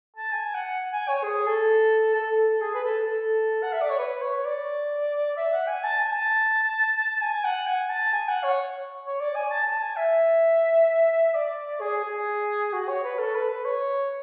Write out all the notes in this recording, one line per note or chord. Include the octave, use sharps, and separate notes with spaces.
A5
G#5
F#5
G#5
C#5
G#4
A4
A4
G#4
B4
A4
A4
F#5
E5
D5
C#5
B4
C#5
D5
E5
F#5
G#5
A5
G#5
A5
G#5
F#5
G#5
A5
G#5
F#5
C#5
C#5
D5
G#5
A5
A5
G#5
E5
D5
G#4
G#4
F#4
C#5
B4
A4
B4
B4
C#5